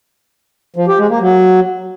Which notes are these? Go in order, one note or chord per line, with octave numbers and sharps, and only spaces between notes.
F3
G4
G#3
A#3
F#3